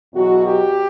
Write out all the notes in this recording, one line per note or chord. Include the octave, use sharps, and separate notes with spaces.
E2 B2 F#3 F#4
G4